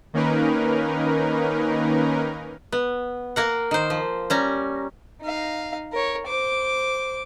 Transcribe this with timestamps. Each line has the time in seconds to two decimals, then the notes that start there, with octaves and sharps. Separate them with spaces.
0.14 D#3 A#3 C#4 D#4 A#4 B4
2.72 B3
3.36 A#3 A#4 F#5
3.71 D#3 C5
3.90 F3
4.30 G3 C#4 A#5
5.21 D#4 F5
5.92 A#4 C#5
6.27 C5 D6